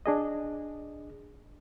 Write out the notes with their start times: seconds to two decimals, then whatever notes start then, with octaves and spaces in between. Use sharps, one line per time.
0.06 D4 G#4 D#5